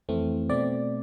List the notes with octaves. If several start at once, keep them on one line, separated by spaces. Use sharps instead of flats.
F2 E3 A3 C4
B2 A3 C4 D5